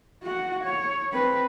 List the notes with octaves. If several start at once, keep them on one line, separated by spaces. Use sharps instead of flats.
F#4 F#5
C#5
C4 B4